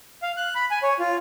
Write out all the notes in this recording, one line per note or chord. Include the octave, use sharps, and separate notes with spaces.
F5
F#6
B5
G#5
C#5
F4